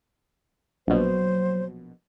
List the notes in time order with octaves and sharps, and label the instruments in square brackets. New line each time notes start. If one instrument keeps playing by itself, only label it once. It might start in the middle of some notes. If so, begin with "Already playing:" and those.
[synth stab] A#1 B2 [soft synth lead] F#3 [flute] C5